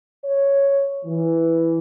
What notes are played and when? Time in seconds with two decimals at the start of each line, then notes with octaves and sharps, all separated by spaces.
0.24 C#5
1.06 E3